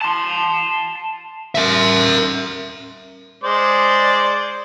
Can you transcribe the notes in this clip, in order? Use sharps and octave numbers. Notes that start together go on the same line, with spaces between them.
A5 C6
A#4 E5
G#3 C5 D5